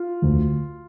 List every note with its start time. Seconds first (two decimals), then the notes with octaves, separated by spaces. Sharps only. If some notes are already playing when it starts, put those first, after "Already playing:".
Already playing: F4
0.22 D2